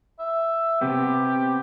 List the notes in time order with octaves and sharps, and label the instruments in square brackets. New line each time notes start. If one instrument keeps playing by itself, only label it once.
[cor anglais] E5
[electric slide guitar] C3 B3 [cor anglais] G4